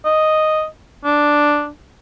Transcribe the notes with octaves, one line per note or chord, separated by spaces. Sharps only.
D#5
D4